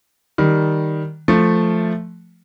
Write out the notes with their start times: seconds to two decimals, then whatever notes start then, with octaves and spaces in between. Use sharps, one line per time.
0.38 D#3 G3
1.28 F3 A3